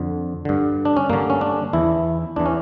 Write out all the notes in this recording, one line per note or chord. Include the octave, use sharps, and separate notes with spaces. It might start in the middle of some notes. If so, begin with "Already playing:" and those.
Already playing: F2 D3
G2 D3
D4
C#4
G2 D3 A#3
C#4
D4
E2 E3 E4
E2 E3 D4
C#4